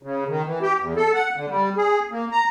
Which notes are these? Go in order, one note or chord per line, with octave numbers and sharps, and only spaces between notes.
C#3
D#3
E3
G4
E2
A4
F#5
D3
G3
G#4
A#3
A#5